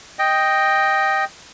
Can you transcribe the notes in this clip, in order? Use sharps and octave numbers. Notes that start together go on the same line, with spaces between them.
D#5 G5